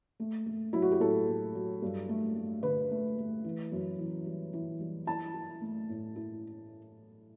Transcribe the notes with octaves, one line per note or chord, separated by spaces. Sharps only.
A3
A3
F#3 E4
F#4
G4
A2 A4
A2
F#3
G2
A3
A3
D3 B4
A3
A3
E3
F#2
E3
G3
E3
G3
E4 A5
E4
A3
A2
E4